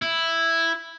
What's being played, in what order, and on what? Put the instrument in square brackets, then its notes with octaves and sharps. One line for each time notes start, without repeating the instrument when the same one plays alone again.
[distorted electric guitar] E4